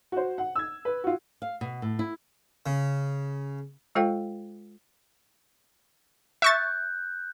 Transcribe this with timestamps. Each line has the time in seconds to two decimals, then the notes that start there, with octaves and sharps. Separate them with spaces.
0.12 F#4 C5
0.38 F#5
0.56 E6 G#6
0.85 B4
1.04 F4 F#4
1.42 F5
1.61 B2
1.82 A2
1.99 E4
2.66 C#3
3.95 G#3 F4 A4 C5 F5 G5
6.42 E5 C#6 F#6 G6 A6